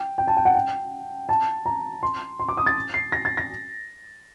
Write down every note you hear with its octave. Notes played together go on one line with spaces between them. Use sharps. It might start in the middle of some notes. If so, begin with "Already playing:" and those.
Already playing: G5
G5
A5
G5
F#5
G5
A5
A#5
C6
C6
D6
D#6
A6
C7
A#6
A6
A#6